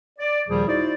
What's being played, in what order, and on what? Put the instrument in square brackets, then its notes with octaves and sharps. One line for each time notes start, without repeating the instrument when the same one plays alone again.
[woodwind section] D5
D#2 A#2 D#3 F3 G3 G#4
D#4 E4 F#4 C5 D5